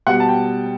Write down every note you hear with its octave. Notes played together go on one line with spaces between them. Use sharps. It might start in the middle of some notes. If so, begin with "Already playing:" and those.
B2 G3 F#5
A5
G5